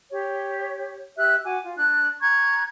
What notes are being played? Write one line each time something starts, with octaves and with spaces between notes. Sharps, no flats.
G4 C#5
G4 E5 F6 F#6
F#4 G#5 D6
F4
D4 F#6
A#5 C#6 F#6 G#6